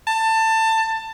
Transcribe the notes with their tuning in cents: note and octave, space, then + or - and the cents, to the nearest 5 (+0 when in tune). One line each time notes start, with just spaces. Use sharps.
A5 +20